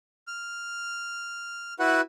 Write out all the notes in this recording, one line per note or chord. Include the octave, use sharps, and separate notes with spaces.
F6
E4 F#4 B4 F#5